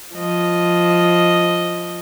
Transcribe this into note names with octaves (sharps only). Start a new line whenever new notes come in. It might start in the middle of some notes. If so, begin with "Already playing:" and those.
F3 D#5